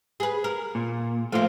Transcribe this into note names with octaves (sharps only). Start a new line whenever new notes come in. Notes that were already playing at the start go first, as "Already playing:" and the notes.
G#4 B4
A#4
A#2
F3 A3 A#3 F4